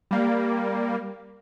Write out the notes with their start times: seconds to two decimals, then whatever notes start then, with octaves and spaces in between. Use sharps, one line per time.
0.11 G3 A#3